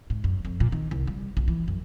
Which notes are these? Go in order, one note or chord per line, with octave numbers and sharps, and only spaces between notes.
G#2
F#2
F2
A#2
D#3
C2
G3
A#1
E3
F#2